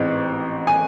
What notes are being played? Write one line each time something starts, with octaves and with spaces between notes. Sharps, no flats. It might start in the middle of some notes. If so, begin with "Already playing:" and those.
Already playing: A1 G#2 E3 C4
G#5